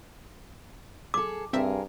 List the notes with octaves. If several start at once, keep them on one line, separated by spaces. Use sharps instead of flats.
G#4 A4 D6
G2 C4 G#4 A#4 E5